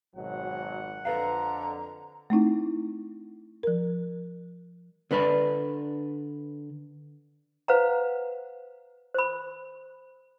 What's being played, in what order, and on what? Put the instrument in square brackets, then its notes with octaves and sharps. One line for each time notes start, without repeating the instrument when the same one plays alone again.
[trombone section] G#1 B2 F#3 [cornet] F#5
[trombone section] F2 D3 [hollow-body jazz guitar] A4 B4 F5 [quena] A#5
[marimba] A3 C4 D#4 E4
F3 A#4
[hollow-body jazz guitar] D3 D4 B4 D5 B5
[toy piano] B4 C5 F5 F#5 A#5
C5 B5